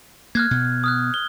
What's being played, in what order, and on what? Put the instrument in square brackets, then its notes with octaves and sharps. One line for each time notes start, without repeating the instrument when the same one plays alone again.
[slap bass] A#3 [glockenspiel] F6 F#6 G#6
[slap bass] B2
[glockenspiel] D#6 F6 F#6
G7